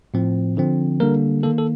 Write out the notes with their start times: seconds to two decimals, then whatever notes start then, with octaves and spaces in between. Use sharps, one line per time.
0.14 A2 F3 C4
0.57 D3 F3 C4
1.00 D3 G3 A#3 A#4
1.43 D#3 A#3 A4
1.58 A4